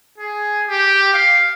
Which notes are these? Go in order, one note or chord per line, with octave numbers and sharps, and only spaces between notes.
G#4
G4
F5